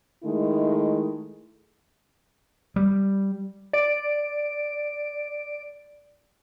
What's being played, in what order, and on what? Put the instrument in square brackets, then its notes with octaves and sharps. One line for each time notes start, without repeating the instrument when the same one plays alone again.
[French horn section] D#3 G#3 A3 E4
[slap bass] G3
[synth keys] D5 D7